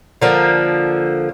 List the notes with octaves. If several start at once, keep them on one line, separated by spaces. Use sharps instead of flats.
D3 F3 A#3